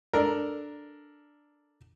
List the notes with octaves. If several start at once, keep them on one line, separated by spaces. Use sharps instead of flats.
D4 A4 A#4